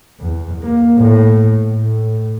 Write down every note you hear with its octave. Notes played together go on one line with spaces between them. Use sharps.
E2
A#3
A2
A2